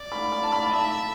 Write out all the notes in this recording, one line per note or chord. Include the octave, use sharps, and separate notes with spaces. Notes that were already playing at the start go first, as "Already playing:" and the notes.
Already playing: D5
B5
B5
A5
B5
E5 A5